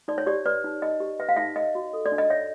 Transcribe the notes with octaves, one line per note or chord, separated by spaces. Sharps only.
D#4 D5
C#5
G4 D5
B4 D5
D#4
D#4 D#5
G4
B4 E5
F5
D#4 E5
C#5 D#5
F#4
A4
D5
D4
D#5
C#5 E5